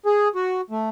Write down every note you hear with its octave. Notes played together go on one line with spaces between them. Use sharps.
G#4
F#4
A3